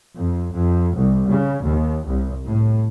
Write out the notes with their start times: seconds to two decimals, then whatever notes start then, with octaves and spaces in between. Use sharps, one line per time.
0.15 F2
0.53 F2
0.97 C2
1.30 C#3
1.66 D#2
2.06 C2
2.45 A2